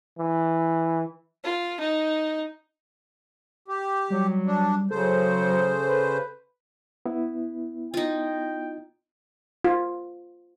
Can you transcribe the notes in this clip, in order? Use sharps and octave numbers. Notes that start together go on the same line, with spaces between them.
E3
F4
D#4
G4
F#3 G3
D4
C#3 F#3 A4 C5
B4
B3 E4
D#4 F4 G5
F4